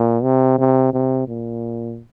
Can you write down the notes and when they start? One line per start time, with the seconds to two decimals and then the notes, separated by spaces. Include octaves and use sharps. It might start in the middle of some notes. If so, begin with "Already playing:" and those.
Already playing: A#2
0.23 C3
0.58 C3
0.93 C3
1.27 A#2